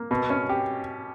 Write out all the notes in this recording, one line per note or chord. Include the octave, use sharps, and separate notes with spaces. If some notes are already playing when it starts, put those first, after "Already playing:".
Already playing: A#3
B2
C#4
G4